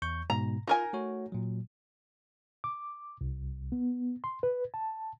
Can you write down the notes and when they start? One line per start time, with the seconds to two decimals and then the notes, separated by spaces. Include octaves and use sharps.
0.02 E2 C#6 G6
0.30 G#2 B2 A#5
0.67 D#4 F4 A#4 G#5
0.93 A3 F#4 C#5
1.32 A#2 F#3
2.64 D6
3.21 C2
3.72 B3
4.24 C6
4.43 B4
4.74 A5